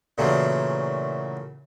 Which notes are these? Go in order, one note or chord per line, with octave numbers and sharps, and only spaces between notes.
A#2 C#3 E3 F#3 A3 A#3